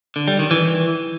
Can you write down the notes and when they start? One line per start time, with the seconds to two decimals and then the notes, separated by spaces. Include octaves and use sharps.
0.16 D3
0.28 G3
0.39 D#3
0.51 E3